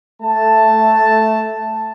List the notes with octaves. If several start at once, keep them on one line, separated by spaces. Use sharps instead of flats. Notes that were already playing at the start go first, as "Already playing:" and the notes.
A3 A5